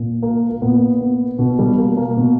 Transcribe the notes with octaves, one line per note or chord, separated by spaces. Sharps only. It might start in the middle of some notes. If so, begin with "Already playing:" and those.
Already playing: A#2
A#3
A#3
A#2 B3
B3
B2 B3
G3
A#3
A#3
B2